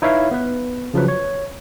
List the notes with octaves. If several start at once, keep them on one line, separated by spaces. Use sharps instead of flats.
D#4 E4 B4 C#5 E5 F5
B3 B4
C#3 F3 F#3 B4
C#5